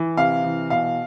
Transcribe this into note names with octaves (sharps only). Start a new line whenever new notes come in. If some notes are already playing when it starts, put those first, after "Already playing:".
Already playing: E3
C3 F5
E3
B2 F5